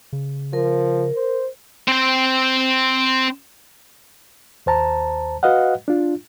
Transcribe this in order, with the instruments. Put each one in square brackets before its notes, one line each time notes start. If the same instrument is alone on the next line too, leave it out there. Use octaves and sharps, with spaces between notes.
[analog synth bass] C#3
[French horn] F3 [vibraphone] A#4
[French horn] C5
[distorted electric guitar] C4 G5
[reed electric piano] D#2 C5 A5 A#5
F#4 B4 D#5 F5 F#5
D4 F4